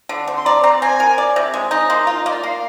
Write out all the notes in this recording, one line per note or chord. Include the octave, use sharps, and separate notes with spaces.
D3
C4
C6
D5 A#5
C4 A#5
C4 G#5
A#4
D5
C3
G#3
D#4
A#3 C6
A#5
F4
D#5
A#3 D5
A#3 F5